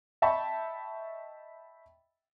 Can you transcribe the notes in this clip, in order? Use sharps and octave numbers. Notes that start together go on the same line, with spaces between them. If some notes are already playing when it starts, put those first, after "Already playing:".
D#5 E5 G5 A5 B5 C#6